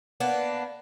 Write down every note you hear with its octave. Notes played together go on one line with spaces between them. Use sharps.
A#3 B3 D4